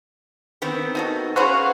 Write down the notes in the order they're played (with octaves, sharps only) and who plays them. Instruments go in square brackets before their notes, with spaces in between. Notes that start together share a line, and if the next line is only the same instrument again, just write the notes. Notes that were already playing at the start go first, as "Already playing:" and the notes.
[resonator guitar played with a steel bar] D#3 B3 C4
[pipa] D#4 F#4 A4
[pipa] C#4 B4 C5 [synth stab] F#4 F#5 [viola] G#4 F5